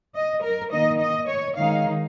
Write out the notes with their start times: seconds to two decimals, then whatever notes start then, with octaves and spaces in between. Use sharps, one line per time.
0.15 D#5
0.42 A#4
0.71 D#3 A#3 D#4 D#5
1.00 D#5
1.28 C#5
1.56 D#3 G#3 D#4 F5